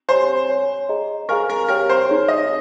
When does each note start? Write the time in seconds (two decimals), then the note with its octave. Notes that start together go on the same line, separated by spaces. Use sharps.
0.09 G4 C5 C#5 G#5 C6
0.49 C#5 G#5 C6
0.89 G#4 D#5 A#5
1.29 G#4 A#4 C5 F5 G#5 C#6
1.50 A#4
1.69 G4 A#4 C#5 G5 A#5 C#6
1.89 C5
2.09 D#4 G#4 C#5
2.28 D#5